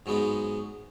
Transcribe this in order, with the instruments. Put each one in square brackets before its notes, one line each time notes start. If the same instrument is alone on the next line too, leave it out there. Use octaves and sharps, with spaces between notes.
[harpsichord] G#2 F#3 G#3 B3 D#4